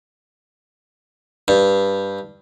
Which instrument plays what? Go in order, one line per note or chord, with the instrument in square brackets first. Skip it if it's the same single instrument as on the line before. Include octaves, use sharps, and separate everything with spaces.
[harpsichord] G2